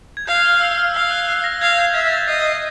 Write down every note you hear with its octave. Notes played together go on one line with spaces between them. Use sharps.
G#6
F5 G6
F#6
F6
E6
F6
F5 F6
F#6
F#6
A#6
F5 G#6
G6
E5 G#6
A#6
A6
D#5 C7
C7